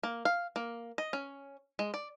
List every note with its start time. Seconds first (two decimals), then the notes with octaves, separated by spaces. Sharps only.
0.03 A#3
0.25 F5
0.56 A#3
0.98 D#5
1.13 C#4
1.79 G#3
1.94 D5